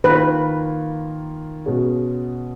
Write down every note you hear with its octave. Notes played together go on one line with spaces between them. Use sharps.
D#3 A#3 F4 B4
B2 G#3 C#4 F#4